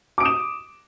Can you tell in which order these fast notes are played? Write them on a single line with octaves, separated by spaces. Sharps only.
D6 D7 D#6 E7